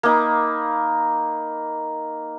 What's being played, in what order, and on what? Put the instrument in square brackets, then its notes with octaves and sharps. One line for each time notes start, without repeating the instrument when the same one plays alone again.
[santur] A#3 D#4 B5